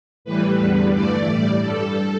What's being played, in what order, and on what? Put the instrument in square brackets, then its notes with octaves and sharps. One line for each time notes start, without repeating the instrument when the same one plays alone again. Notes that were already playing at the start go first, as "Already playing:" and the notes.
[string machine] A2 E3 G3 B4
E2 D3 G3
G2 E3 A3 D5
A2 G3
G2 G3 A4